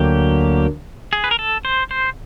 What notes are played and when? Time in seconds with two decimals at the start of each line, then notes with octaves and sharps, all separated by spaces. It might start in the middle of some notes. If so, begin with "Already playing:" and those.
Already playing: D2 D3 F#3 A#3 G4
1.13 G#4
1.24 B4
1.31 A#4
1.39 A4
1.65 C5
1.91 C5